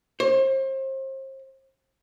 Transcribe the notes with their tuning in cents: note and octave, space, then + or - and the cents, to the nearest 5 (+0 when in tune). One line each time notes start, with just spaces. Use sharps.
C5 +35